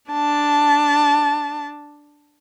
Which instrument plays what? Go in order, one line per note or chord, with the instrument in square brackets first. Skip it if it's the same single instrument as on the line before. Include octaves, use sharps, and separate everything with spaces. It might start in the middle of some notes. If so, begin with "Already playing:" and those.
[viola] D4 A5